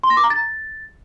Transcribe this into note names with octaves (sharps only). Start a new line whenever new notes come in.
C6
A#6
D6
A#5
A6